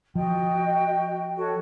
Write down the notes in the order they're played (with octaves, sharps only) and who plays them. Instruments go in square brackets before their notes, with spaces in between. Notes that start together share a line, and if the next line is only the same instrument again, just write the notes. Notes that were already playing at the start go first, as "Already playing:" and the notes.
[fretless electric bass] F3 [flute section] F#4 D#5 G5
[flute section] F#4 A4 C#5